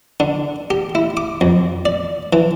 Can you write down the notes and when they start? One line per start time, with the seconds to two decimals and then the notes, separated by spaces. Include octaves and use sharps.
0.20 D3
0.70 G4
0.95 E4
1.17 D6
1.41 F2
1.85 D5
2.33 E3